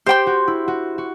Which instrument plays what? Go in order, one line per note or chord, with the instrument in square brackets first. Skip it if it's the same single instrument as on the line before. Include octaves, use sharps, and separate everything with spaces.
[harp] G4 [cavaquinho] C5 G5 C6
[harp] F#4
E4
F#4
F#4